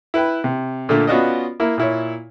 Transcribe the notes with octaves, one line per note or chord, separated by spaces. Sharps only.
E4 B4 G5 B5
C3
A#2 D3 A3
B3 C#4 F4 F#4 D5 D#5
A#3 E4
A#2 E4 C#5